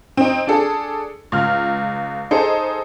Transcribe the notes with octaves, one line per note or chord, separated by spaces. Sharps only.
C4 D#4
D4 G#4 A4
C#2 F6
D#4 G#4 A4 C5